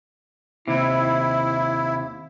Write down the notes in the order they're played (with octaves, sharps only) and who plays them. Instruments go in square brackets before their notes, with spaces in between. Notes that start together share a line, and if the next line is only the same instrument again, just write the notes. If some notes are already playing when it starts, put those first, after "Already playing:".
[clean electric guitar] D#2 C3 [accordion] E4